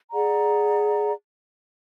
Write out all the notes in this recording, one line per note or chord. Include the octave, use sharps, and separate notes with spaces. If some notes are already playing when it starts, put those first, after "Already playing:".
G#4 D5 F#5 A#5